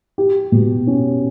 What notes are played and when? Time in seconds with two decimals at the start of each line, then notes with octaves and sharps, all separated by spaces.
0.18 G4
0.52 B2
0.87 C#4